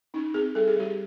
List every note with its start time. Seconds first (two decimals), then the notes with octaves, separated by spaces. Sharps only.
0.14 C#4 D#4
0.34 C4 G#4
0.55 G3 A4
0.68 G#4
0.76 G3 G4